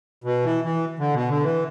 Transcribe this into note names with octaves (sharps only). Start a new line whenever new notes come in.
B2
E3
E3
D3
B2
D3
E3